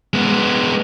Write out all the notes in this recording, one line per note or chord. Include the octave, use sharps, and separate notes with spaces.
G#3 B3